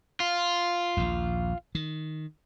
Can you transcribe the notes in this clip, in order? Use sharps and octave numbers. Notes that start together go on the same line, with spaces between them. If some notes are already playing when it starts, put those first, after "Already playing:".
F4
A#1 D#2
D#3